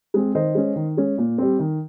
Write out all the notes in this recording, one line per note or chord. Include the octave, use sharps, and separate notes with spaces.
G#3 C4
D#3 C5 D#5
G#3 C#4
D#3
G#3 C#4
A#2
G3 C4
D#3